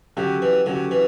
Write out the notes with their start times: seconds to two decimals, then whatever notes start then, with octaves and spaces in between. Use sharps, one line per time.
0.17 D3 F#3 C#4 G4
0.42 E3
0.66 D3 F#3 C#4 G4
0.91 E3